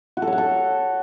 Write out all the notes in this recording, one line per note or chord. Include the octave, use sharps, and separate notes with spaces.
F#4
A4
C#5
F#5
A4